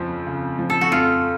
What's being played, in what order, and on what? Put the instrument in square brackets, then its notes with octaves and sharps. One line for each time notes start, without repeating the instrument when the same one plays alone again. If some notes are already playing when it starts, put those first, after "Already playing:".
Already playing: [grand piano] F2 C#3 F3
C#3
F3
[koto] A4
F#4
[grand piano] F2 [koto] F4